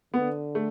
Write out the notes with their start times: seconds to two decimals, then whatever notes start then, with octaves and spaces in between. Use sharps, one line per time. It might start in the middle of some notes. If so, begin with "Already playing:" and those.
0.14 D3 B3
0.55 A3